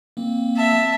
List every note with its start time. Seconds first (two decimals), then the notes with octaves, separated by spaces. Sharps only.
0.17 A#3 C4
0.57 E5 A5